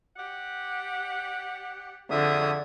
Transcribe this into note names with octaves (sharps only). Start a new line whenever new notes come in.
G4 D5 F#5
F2 D3 G#4 E5 D#6